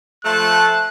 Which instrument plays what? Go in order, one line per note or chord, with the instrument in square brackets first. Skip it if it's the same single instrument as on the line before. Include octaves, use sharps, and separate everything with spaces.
[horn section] F3 A3 A5 [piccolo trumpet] F#6